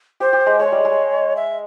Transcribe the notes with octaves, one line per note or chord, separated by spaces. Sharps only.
G4 C5
G4
G#3
G#3 C#5
G3
G#3
E5